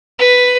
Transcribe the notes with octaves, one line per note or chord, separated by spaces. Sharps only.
B4